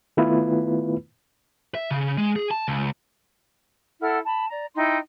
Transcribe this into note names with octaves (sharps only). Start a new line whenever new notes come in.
D#3 A3 B3 E4 F4 B4
E5
C#3
G#3
G#4
A5
C#2
E4 A4 F#5 F6
A5 B5
D5 A#5
D#4 E4 G5 C6